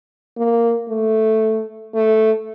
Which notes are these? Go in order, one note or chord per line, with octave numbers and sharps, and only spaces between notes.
A#3
A3
A3